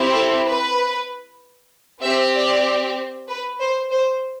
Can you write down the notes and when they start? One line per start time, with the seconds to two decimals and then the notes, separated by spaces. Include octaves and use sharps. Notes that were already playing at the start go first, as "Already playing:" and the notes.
Already playing: C4 E4 G4
0.14 A4
0.46 B4
2.02 C4 G4 E5
2.33 D5
3.28 B4
3.59 C5
3.90 C5